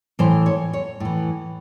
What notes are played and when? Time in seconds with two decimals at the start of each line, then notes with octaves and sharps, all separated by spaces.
0.19 A2 E3 C5
0.46 C#5
0.73 C#5
1.00 A2 E3